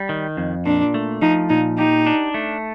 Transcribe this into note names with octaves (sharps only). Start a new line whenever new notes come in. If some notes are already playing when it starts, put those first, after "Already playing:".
Already playing: G3
D#3
F2
A#2 D4
A3
F3 D#4
A#2 D#4
D#4 G4
D4
A3